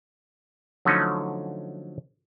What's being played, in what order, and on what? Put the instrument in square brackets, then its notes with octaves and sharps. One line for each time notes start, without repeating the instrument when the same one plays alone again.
[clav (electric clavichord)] D3 F3 F#3 A3 C#4 D#4